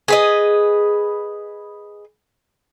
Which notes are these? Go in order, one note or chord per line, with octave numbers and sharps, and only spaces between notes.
G#4 B4 D#5